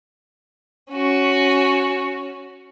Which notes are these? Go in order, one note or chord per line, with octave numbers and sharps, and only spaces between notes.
C#4 F#4